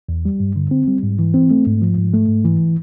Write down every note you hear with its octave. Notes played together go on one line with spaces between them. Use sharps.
E2
G3
G2
D3
C4
G3
G#2
E3
C4
A3
G#2
F3
G#2
A3
G#2
E3